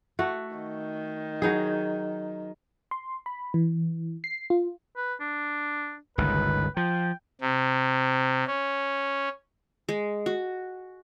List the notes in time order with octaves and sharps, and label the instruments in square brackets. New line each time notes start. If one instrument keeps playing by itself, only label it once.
[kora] A3 F#4
[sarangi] D#3
[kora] F#3 D#4 G#4
[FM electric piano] C6
B5
E3
C7
F4
[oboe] B4
D4
[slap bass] G1 C#2 D#3 [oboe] B4
[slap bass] F3 [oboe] G5
[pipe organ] C3
C#4
[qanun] G#3
F#4